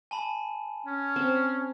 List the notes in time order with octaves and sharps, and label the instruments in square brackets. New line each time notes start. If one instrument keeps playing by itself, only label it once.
[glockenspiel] G#5 A5 B5
[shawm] C#4
[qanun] C4